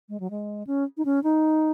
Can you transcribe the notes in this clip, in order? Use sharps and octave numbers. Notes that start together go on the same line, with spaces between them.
G#3
F#3
G#3
C#4
D#4
C#4
D#4